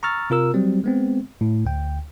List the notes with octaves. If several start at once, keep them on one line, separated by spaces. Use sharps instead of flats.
A#5 C#6 E6 F6 A6
C3 F4 A#4 E6
F#3 G3 C4
G#3 B3 C4
A2
D2 G5